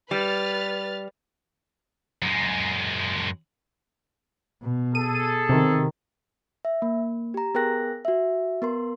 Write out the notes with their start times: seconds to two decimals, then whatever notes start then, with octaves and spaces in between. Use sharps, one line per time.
0.11 G3 B4 F6 A6
2.22 F#2 G#3
4.63 B2
4.95 G#4 A4 D#7
5.49 C3 D#3
6.65 E5
6.82 A#3
7.34 G4 A#5
7.54 B3 G#4 A#4 G5 F#6 A#6
8.05 F#4 E5
8.62 B3 A#4 C6